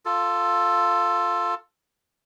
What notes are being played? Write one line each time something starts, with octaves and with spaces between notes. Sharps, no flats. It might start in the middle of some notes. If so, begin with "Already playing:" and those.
F4 A4